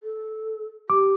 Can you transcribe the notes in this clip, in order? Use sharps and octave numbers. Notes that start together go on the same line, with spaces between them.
A4
G4 D6